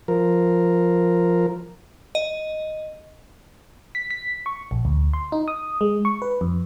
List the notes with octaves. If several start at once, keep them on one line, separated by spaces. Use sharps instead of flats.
F3 A#4
D#5
B6
B6
C#6
A#1
D2
C6
D#4
D#6
G#3
C#6
B4
F2